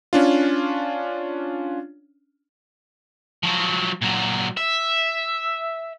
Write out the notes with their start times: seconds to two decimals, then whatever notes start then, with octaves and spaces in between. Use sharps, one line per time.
0.13 C#4 D4 F4
3.43 F3 F#3
4.02 A#2 F#3
4.57 E5